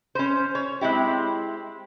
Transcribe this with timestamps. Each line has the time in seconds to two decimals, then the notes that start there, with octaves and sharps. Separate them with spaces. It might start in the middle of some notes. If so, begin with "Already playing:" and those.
0.15 C#4 C5
0.55 C#5
0.81 G#3 C4 E4 G4